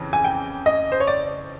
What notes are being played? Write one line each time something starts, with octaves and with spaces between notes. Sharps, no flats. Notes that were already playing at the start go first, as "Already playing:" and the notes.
Already playing: F2 C#3 E3
G#5
G5
D#5
C5
C#5
D5